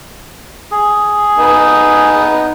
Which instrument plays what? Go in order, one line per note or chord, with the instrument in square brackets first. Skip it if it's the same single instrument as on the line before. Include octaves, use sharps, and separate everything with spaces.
[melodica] G#4
[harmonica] B3 D#4